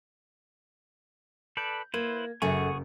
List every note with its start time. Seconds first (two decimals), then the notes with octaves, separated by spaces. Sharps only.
1.57 A4 B4 D5 G6
1.94 A#3 E4 B4 C5 G#6
2.42 F#1 F#2 A3 G#4 F#5 G#5 C#6